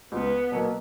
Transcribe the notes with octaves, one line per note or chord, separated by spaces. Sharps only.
C#2 B3
B2 F#3 A#3